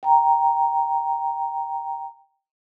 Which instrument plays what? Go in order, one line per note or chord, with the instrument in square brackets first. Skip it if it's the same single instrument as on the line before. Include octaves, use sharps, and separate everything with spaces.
[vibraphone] G5 A#5